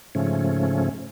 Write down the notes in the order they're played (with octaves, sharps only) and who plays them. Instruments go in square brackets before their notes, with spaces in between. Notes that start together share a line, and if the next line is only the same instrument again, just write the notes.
[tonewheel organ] G#2 C#3 F3 A3 C#4